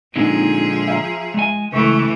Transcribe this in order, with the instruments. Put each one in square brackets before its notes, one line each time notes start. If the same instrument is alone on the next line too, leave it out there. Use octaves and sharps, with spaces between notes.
[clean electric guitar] A#2 D3 G#3 [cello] F3 G#4 [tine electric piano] A#3 C4 D#4
[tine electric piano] E5 F5 A#5
[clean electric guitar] G#3 G#5
[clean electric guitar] C#2 [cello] E3 A3 [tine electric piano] B4 C#6